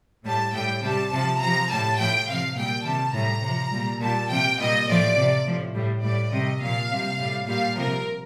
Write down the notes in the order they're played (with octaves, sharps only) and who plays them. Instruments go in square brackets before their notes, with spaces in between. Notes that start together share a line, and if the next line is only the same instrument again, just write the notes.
[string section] A2 G3 A5
A2 G3 G5
C3 G3 A5
C3 F3 A5
C3 F3 A#5
A2 G3 A5
A2 F3 G5
C3 F3 F5
A#2 G3 G5
C3 D#3 G3 A5
A2 G3 A#5
C3
F3
A#2 G3
A#2 G3 A5
C3 F3 G5
A#2 G3 D#5
A2 F3 D5
C3 F3
A2 F3
A2 G3
A2 G3 D5
C3 D#3 G3 D#5
A#2 F3 F5
C3 G3
A2 G3
A#2 G3 F5
C3 F3 A#4